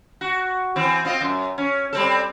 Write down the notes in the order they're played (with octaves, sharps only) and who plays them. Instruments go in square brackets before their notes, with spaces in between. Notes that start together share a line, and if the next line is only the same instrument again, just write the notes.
[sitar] F#4
E3 C4
C4 F4 D#5
F#2
C#4
G3 C4 A4